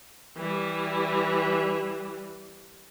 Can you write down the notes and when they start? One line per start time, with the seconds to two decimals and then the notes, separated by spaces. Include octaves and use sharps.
0.36 E3 G3